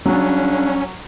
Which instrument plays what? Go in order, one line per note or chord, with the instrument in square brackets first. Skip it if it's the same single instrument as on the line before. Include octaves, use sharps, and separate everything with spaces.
[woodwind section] C#3 G3 D4 [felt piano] F#3 [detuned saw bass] C#4